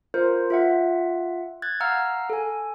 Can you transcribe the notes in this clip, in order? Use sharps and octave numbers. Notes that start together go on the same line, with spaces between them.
F4 A#4 C5
F4 E5 F#5
F#6 G#6 A6
F5 F#5 A#5 E6 F6
A4 G#5